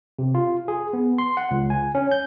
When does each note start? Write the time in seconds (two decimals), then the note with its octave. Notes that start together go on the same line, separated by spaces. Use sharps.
0.19 C3
0.35 F4
0.68 G#4
0.93 B3
1.18 C6
1.37 F#5
1.51 C#2
1.70 G#5
1.95 C#4
2.12 G6